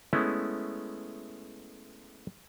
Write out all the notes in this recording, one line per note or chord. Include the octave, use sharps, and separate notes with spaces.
G#3 A3 B3 C#4 E4